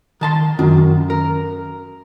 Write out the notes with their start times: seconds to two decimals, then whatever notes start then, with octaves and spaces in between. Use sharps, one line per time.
0.21 D#3 A5 C6
0.59 F#2 D#3
1.10 A#4